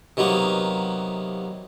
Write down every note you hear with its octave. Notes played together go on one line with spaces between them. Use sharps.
C3 D#3 F#3 A#3 B3